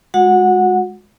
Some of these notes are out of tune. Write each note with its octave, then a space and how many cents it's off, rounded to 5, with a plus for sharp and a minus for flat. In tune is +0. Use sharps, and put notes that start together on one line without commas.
G#3 +0 F#4 -30 F#5 -10